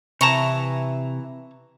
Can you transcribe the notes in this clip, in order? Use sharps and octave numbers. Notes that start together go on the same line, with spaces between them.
C3 E3 A5 A#5 C#6